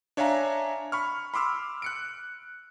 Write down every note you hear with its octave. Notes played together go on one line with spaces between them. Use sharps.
D4 C#5 E5 F5 G#5 A#5
B5 C#6 F6
B5 C6 D6 E6 F6
F#6 C#7 D7